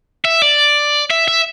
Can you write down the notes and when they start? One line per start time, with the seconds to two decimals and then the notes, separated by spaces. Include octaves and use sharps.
0.25 E5
0.42 D5
1.10 E5
1.28 E5